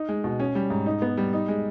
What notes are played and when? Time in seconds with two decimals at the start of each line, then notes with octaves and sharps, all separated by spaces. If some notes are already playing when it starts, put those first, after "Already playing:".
Already playing: D#4
0.09 G#3
0.24 B2
0.40 C#4
0.55 G3
0.70 G#2
0.86 D#4
1.02 B3
1.17 G3
1.33 D#4
1.48 G#3